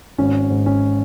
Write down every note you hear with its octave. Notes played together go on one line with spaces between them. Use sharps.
G#1 C#4
G#2
C#4